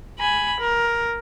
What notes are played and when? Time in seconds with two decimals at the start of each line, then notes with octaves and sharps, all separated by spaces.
0.19 G#5 B5
0.60 A#4